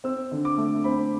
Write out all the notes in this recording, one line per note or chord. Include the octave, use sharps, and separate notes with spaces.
C4 E6
D3
D6
A3
C4 B5